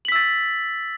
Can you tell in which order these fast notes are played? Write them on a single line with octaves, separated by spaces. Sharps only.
F#7 B6 E6 A6